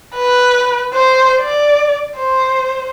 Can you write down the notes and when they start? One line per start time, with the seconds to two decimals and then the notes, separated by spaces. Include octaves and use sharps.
0.15 B4
0.94 C5
1.42 D5
2.17 C5